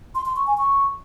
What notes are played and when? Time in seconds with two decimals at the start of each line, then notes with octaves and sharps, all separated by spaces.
0.15 C6
0.26 C6
0.36 C#6
0.47 G#5
0.58 C#6